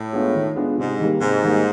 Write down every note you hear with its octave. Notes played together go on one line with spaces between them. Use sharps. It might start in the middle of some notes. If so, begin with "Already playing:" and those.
Already playing: A2
G#3 B3 D4 F4
D#3
G#3 B3 D4 F4
G#2 C3
D#3 G3 A#3
G#2 C3
D#3 G3 A#3